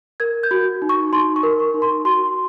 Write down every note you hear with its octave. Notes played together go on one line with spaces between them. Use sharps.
A#4 G#6
G6
F#4
D#4
C#6
D#4 C6
C#6
A#4
C#6
D#4
C6
F#4 C6